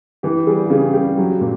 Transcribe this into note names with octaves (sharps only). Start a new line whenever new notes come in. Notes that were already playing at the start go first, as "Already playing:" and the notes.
E3 G4
G3 G#4
G4
C#3 G#4
G3 G4
F#3
A#2